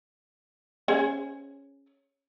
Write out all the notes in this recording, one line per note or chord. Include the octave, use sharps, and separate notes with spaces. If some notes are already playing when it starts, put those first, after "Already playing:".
C#4 G#4 C5